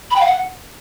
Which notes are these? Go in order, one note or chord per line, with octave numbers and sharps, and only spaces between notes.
B5
G5
F5
F#5